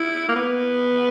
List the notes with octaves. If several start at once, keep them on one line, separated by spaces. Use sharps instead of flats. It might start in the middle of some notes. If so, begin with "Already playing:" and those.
Already playing: E4
A#3
B3